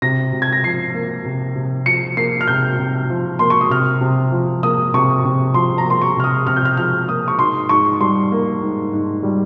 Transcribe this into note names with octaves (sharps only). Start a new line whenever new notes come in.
C3 A#6
C3
G#6
A#6
F3 C7
A#3
C3
C3
F3 C#7
A#3 C7
F6
C3 G6
C3
F3
A#3 C6
C#6
D#6
C3 F6
C3
F3
A#3 D#6
C3 C#6
C3 C#6
F3 C6
A#5
A#3
C6
C#6
C3 F6
D#6
C3 F6
G6
F6
F3 F6
A#3 D#6
C#6
G#2 C6
G#2 C#6
G3 C6
A#3
G#2
G#2
G3